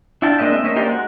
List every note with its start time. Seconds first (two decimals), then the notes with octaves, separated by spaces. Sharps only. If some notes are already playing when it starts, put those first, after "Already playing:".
0.22 D4 E4 F4 G5 A5
0.38 G#3 A#3 D4 D#5 E5
0.52 C4 E5
0.64 A#3 C#4 D#5 E5
0.76 A#3 D#4 G4 C5 D5
0.88 G#3 F#4